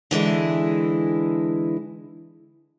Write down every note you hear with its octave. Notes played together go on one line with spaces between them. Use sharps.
D3 E3 G#3 E4